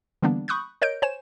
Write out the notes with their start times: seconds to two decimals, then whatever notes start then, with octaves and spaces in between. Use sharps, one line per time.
0.22 D3 E3 G3 A#3 B3 D4
0.48 B5 C#6 D#6 F#6 G6
0.82 A#4 C#5 D#5 G6 D7
1.02 C5 C#5 G#5 E7